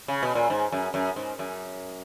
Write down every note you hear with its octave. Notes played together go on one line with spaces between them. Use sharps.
C#3
B2
A#2
G#2
F#2
F#2
G#2
F#2